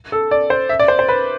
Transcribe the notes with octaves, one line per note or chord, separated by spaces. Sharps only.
A4
D5
C5
E5
D5
C5
C5
B4